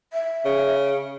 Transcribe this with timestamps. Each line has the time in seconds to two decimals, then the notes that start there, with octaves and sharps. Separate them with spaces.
0.13 E5
0.45 C#3